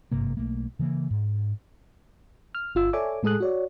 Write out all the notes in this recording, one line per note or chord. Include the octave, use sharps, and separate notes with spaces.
G#1 G2 C3 A#3
B1 A3 A#3
C#3 E3 A#3
G#2
F6
G1 F4 E6
A4 C#5 D5 E5 G#5 D6
A2 G#3 G#4 A4 D#6 F#6
F#4 C#5 D5